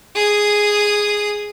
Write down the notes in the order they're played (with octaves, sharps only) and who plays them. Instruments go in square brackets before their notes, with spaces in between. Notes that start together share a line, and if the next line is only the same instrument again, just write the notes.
[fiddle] G#4 D#6